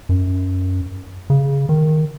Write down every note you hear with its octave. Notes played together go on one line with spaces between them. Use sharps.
F#2
C#3
D#3